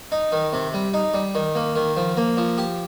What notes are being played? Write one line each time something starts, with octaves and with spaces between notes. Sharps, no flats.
D#4
D#3
C3
G3
D#4
G3
D#3
A#3
D#3
F3
A#3
F3
G4